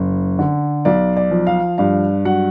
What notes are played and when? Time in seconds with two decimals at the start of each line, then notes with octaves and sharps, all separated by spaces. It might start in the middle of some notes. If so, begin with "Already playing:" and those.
Already playing: F#1
0.39 D3
0.85 B1 D5
1.16 D5
1.31 F3
1.47 F5
1.78 G2 F5
2.25 F#3 F#5